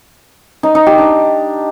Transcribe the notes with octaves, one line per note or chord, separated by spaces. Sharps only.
D#4
D#4
G4
D4